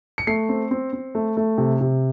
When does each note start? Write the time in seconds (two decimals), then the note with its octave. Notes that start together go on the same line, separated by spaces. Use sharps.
0.18 C#7
0.27 A3 C7
0.49 C4
0.71 C4
0.93 C4
1.15 A3
1.37 A3
1.58 C3
1.81 C3